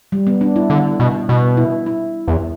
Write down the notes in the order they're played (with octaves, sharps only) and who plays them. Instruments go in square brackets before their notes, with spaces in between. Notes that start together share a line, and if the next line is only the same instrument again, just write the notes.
[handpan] G3
B3
D4
E4
[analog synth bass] D3
B2
B2
[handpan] E4
E4
[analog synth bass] E2